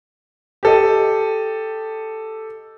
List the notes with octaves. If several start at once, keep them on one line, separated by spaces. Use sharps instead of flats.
G4 A4 D#5